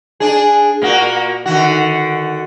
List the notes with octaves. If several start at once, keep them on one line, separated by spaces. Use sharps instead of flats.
D4 G#4
A#2 A#3 F#4
D3 D#3 F#4